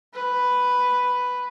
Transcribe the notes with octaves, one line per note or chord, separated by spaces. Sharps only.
B4